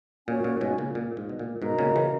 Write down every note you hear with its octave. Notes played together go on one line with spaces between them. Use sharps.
A#2 C#4 F#4 C#5 G#5
A#2
G#2 B2
A#2 C#3
A#2
G#2
B2
A#2
G#2 B2 F#4 A#4 D#5 A#5
A#2 C#3
C#3 E3